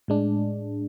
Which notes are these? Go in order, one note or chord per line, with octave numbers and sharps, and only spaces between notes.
A2 G#3 D4